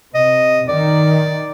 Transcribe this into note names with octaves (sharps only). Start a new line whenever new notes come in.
C3 D#5
D#3 D5